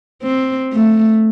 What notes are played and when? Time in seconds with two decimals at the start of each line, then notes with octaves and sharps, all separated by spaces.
0.22 C4
0.72 A3